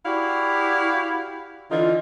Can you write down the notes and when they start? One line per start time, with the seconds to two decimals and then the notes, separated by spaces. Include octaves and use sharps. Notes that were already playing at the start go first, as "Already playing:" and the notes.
0.06 E4 F#4 G4 D5 F5
1.71 D3 E3 D#4 F4